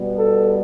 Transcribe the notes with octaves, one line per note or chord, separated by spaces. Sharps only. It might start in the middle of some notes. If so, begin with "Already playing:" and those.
Already playing: B2 G3 B3
A4